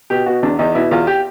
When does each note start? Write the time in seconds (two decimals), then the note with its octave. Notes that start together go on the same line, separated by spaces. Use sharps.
0.10 B2 G4
0.26 B2 F#4
0.42 E2 D4
0.59 E2 D#4
0.75 B2 E4
0.91 E2 F4
1.07 G4